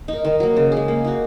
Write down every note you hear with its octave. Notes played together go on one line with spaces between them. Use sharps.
D#4 A#4
D#3
F#3 A#3
C#3
G#3 C#4 G#4
A#3
D#4 F#4